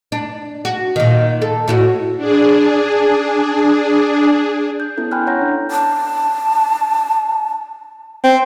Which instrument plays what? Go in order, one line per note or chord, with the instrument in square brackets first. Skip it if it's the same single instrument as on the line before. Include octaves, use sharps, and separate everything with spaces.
[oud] D4
F#4
A#2 D#3
A4
A2 E4 F#4
[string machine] D4 G#4
[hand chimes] G6
B3 C#4 E4 A4
G5 G#5 B5 C6 F6 F#6
C#5 F#5 A#5 G6 A#6
D4
[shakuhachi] A5
[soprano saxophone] C4